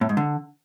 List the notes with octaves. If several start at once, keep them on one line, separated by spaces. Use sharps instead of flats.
A2
G#2
D3